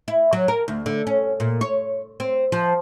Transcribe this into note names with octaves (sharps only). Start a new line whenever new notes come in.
E4
F#3
A#4
D2
D3
C#4
A#2
C#5
C4
F3